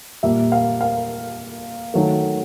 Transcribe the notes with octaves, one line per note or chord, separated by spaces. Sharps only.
A#2 G3 A#3 E5
F5
F5
D#3 F#3 A3